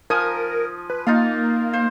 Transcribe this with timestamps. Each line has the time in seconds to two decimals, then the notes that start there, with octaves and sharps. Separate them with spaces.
0.10 F3 A#4 G#5 D#6
0.90 B4
1.07 A#3 D#4 F4 F5
1.73 C5